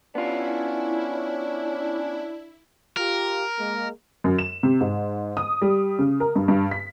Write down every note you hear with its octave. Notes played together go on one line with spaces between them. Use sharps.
B3 C#4 D4 E4 F4
F4 G4 A#4
G#3 A#3
F#2
E7
C3
G#2
D#6
G3
C#3
A#4
G2
G2
B6